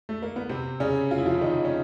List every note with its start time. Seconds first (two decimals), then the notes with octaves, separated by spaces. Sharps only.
0.09 A3
0.23 A#3
0.36 B3
0.49 C3 C4
0.80 C#3 C#4
1.11 F4
1.18 E4
1.26 F3 F4
1.41 D#3 D#4
1.65 C#4